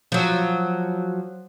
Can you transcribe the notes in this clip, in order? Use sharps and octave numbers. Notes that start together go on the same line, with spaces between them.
F3 F#3